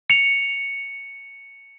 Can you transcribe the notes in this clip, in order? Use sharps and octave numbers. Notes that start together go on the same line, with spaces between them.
C#7 F7